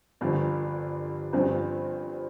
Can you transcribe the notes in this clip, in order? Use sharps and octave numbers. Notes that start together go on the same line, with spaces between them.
G1 G2 D3 F3
G1 G2 F3 C4